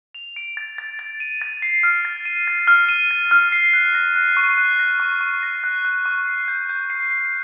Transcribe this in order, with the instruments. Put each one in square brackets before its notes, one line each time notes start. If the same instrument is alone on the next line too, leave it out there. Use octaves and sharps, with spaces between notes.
[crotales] F7
D7
A6
A6
A6
D#7
A6
C7
F6
A6
D#7
A6
F6
D#7
A6
F6
C7
F#6
A#6
F#6
C#6
F#6
A#6
C#6
C#6
A#6
F#6
F#6
C#6
C7
G6
G6
C7
C7